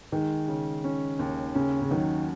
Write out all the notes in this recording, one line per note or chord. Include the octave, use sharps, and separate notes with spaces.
D#3 G#3
C#3
C#4
D#2
C#3 C#4
C#3
D#3 F#3